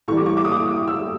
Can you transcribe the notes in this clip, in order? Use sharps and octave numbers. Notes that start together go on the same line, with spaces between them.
A2 E3 G3 C#6
D6
C#6
D6
D#6
D6
D#6
E6